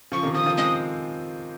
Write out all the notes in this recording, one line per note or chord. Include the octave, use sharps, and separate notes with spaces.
C#3 F3 C#6
C3 D#3
C#3 F3 D#6
C#3 F3
G#3 C4 D#6